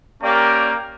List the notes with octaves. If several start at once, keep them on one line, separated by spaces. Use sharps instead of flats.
A#3 C#4 G4 A#4 D5